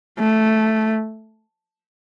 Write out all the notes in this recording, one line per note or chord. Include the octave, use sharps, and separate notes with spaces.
A3